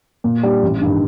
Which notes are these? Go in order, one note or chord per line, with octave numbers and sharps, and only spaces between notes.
A#2
G3 D4 G4
A1
G2 D#3